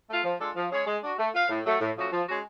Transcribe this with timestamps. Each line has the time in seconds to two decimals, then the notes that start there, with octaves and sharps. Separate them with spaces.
0.09 A3 F4
0.24 F3
0.40 G#3 D4 F4 A4
0.55 F3
0.71 G#3 C#4 G#4 C#5
0.86 G#3
1.03 D4 F#4
1.18 A3
1.34 F4 B4 F5
1.49 A2
1.65 F#3 A3
1.80 A2
1.96 F3 A3 C#4 F#4
2.12 F3
2.28 G#3 C#4 F#4